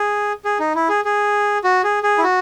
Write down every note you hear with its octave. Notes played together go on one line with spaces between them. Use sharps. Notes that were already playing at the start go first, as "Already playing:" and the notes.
Already playing: G#4
G#4
D#4
E4
G#4
G#4
F#4
G#4
G#4
E4
F#4